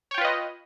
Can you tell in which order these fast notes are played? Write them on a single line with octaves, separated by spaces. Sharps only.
C#5 G5 F4 B4 D#5